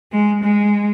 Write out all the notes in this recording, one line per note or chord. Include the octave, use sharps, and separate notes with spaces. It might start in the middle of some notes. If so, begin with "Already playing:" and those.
G#3
G#3